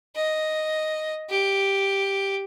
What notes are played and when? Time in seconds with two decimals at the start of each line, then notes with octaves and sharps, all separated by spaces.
0.15 D#5
1.30 G4